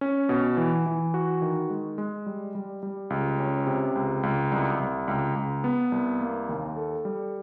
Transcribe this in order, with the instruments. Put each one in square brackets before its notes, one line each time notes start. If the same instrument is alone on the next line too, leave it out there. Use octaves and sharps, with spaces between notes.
[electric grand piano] C#4
B2
E3
E3
F#4
D#3
G#3
G#3
G3
G3
G3
C#2
C#4
C3
C#2
C#2
C2
C2
C#2
C#2
B3
C2
A#3
D#2
A4
G3